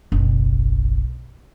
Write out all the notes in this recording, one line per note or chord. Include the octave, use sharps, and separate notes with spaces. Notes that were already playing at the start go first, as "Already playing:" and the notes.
F#1 B1